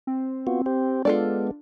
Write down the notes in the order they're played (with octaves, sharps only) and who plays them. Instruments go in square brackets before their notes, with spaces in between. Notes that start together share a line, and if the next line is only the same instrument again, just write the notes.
[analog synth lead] C4
[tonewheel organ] B3 F4 F#4
G4 C5
[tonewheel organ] G#3 B3 [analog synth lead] D4 [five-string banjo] F4 A4 D5